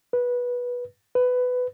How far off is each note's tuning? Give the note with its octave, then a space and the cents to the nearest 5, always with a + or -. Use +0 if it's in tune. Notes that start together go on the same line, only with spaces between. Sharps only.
B4 -15
B4 +15